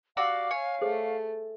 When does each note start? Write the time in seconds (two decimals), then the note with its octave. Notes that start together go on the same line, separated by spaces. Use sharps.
0.17 F#4 G4 D5 F5 E6
0.51 C#5 G#5
0.81 A3 G#4 C5